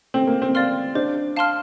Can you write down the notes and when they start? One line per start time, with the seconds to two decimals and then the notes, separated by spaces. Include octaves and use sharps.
0.14 C4 A4
0.27 A#3
0.42 C4
0.55 D5 F5 C6 F6
0.95 D4 C5
1.37 F5 A5 C6 F6